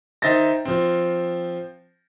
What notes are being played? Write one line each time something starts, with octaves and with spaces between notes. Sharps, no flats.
D#3 D#4 C5 E5 A6 A#6
F3 C4